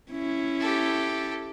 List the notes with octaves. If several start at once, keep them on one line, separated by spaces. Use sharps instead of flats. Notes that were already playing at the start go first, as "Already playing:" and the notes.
C#4 E4
G4 A4